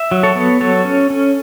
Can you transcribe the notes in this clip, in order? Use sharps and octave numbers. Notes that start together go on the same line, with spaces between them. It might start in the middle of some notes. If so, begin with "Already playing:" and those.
Already playing: E5
F#3
A4 C#5
B3
F#3 A4 C#5
C#4
C#4